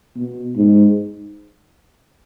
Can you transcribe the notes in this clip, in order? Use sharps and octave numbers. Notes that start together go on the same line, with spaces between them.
B2
G#2